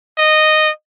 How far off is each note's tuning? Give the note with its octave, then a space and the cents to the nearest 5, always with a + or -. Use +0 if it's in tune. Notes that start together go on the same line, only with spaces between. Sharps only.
D#5 -10